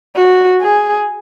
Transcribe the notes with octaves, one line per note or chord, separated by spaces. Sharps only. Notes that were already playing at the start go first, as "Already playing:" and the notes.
F#4
G#4